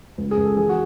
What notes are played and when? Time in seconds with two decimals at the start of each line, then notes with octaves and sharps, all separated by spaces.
0.18 C#2
0.31 G#4
0.37 C#2
0.44 A4
0.57 E3 G#4
0.69 F#4